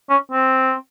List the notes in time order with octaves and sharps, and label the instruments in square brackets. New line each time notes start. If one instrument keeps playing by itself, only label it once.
[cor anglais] C#4
C4